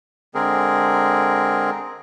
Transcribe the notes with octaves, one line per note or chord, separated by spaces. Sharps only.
D3 G#3 C4 G#4 A#4